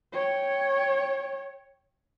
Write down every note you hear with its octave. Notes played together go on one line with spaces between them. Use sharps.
C#5 G5